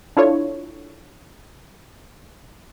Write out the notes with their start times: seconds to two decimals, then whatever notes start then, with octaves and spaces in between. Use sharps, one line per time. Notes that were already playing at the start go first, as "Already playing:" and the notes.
0.17 D4 E4 F4 A4 C#5